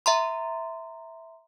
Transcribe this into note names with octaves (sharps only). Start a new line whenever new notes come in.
E5 A#5 C6